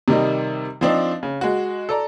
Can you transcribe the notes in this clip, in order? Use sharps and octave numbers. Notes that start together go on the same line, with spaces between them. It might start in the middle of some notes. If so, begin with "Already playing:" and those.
C3 D#3 G3 D#4
F3 C4 D4 D#4
C#3
G#3 F#4
A4 D5 A#5